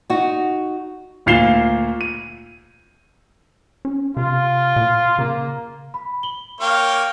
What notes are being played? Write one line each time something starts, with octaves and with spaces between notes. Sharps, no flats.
D#4 F#4
D2 A#2 F5 C7 E7 G7
D#7
C#4
C3 F4
A#2
C#3 A#3
B5
F#7 G7
A#3 C#5 F5 G5